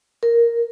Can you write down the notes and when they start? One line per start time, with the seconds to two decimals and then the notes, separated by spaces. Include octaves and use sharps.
0.23 A#4